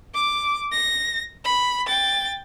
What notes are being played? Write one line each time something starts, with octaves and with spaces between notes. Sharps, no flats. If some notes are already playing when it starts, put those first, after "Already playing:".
D6
A#6
B5
G5 A6